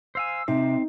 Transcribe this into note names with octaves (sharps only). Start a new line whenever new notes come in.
C5 F5 G#5 E6
C3 C4 D#4